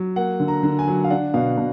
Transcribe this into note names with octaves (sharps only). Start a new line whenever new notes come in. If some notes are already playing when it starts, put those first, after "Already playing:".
Already playing: F#3
A#3 F#5
D3
A#5
D3
G#5
F#3
F5
D4 F#5
B2 F5
B2